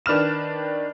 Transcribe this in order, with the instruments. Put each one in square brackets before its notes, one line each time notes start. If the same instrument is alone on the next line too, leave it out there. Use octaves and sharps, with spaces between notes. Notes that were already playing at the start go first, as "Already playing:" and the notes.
[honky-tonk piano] D#3 D4 B4 F6 E7